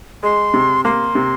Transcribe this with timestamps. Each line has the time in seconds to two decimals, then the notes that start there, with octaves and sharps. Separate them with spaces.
0.23 G#3 C6
0.54 C3
0.85 A#3 C6
1.15 C3